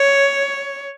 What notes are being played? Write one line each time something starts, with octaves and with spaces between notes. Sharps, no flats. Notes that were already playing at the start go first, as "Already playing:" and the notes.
Already playing: C#5